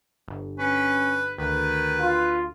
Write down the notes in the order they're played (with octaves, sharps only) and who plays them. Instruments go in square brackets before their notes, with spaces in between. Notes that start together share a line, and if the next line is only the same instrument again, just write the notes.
[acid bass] G1
[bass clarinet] C#4 [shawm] B4
[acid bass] D2 [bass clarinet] D#3 [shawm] B4
[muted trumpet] F4